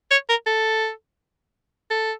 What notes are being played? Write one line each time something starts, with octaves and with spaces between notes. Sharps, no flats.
C#5
A#4
A4
A4